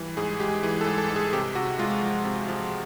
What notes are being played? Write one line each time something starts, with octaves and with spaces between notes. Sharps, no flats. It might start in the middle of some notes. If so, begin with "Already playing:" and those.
Already playing: E3 G3
G#2 G#4
G#3 G4
E3 G#4
A4
G#2
A4
G#2
G#4
C3 G4
C3 F#4
G#3 F4
F3
C3
F3